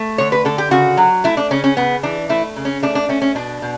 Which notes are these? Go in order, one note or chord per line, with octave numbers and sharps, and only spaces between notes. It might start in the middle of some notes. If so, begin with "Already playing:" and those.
Already playing: A3
D3 C#5
B4
D3 A4
G4
C#3 F#4
F#3
A3 E4
D4
C#3 C#4
C#4
C#3 B3
E3 D4
A3 E4
C#3
C#4
A3 D4
D4
A3 C#4
C#4
B2 D4
B2